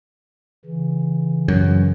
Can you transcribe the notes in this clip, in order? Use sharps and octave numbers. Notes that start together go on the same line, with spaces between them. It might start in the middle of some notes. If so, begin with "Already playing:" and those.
C#3 E3
F#2